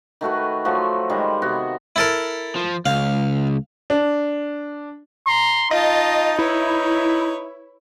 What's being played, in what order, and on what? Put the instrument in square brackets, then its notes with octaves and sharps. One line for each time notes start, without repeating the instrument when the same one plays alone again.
[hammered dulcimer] D#3 A3 F#4 B4
F3 F#3 A3 F#4
D#3 G3 G#3
C3 B3 F#4
[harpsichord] E4 A4 A#4
[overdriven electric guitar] F3
[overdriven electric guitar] C#2 [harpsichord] F5
[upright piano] D4
[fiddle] A#5 [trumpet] C6
[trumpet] D#4 [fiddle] F4 A5 [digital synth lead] D#5
[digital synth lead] E4 [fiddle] B4 C#5